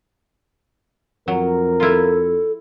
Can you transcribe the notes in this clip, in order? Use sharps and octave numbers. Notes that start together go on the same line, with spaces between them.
F2 F#3 A#4
E4 F4 A4